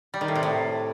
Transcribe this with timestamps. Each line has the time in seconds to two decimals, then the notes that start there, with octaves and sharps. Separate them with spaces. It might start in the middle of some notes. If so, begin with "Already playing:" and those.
0.14 G3
0.21 D#3
0.28 A2
0.35 C3
0.43 A2